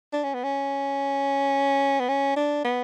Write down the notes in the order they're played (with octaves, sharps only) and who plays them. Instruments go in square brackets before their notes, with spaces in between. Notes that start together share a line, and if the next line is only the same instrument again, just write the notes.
[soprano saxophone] D4
C#4
B3
C#4
B3
C#4
D4
B3